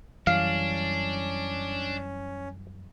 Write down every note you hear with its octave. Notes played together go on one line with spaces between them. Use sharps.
F#2 E3 G3 C#4 D4 F5